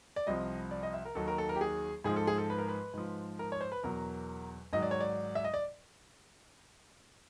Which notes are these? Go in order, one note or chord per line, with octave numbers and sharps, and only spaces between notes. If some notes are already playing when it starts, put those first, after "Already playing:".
D5
C2 C3 F3 D#5
D5
D#5
E5
A#4
D#2 D#3 F#3 A4
A#4
A4
A#4
G4
G#4
G#2 F3 G#4
A4
G#4
A4
B4
A#4
B4
G#2 F3
A#4
C#5
C5
B4
E2 B2 F#3 A#4
G#2 D#3 F#3 D#5
D5
C#5
D5
E5
D#5
D5